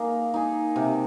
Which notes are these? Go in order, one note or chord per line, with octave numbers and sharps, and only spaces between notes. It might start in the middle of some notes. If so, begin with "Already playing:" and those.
Already playing: A#3 D#4 G#4
D#4 G#4
C3